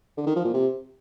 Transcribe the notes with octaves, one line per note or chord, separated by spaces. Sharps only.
D3
D#3
F3
A#2
C3